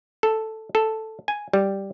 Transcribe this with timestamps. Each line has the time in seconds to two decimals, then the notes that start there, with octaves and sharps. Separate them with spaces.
0.23 A4
0.75 A4
1.28 G#5
1.53 G3